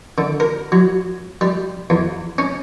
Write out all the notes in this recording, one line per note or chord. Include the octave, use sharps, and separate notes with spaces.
D3
A#4
F#3
G3
E2
C#4